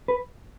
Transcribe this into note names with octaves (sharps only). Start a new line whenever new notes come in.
B4